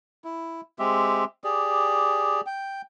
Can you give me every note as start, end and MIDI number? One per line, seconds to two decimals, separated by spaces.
0.24 0.61 64
0.79 1.25 56
0.79 1.25 60
0.79 1.25 67
0.79 1.25 76
1.44 2.41 67
1.44 2.41 68
1.44 2.41 74
2.46 2.82 79